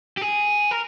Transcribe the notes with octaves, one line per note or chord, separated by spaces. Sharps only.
G4
G#4
A#4